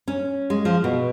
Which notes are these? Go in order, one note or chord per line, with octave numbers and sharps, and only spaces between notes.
C#4
G#3
F3
B2